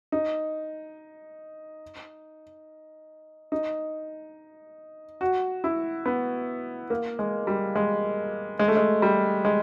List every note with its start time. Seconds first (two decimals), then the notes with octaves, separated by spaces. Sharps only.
0.12 D#4
3.52 D#4
5.21 F#4
5.64 E4
6.06 B3
6.90 A#3
7.19 G#3
7.47 G3
7.75 G#3
8.59 G#3
8.68 A3
8.77 G#3
9.02 G3
9.45 G#3